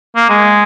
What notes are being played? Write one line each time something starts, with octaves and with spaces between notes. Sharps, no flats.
A#3
G#3